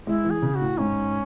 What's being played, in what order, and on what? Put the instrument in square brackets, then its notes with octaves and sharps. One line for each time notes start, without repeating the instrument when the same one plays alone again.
[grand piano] G#3 [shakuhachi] E4
[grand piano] E3
[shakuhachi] G#4
[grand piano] C#3
[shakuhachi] F#4
[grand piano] A2
[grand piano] G#2 [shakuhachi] C#4